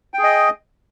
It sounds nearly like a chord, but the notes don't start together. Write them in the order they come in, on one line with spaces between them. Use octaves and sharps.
G5 G#4 D#5